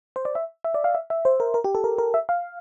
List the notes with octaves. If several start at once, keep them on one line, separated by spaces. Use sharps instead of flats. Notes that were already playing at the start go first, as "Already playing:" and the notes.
C5
D5
E5
E5
D5
F5
E5
E5
C5
A#4
A#4
G4
A4
A#4
A#4
E5
F5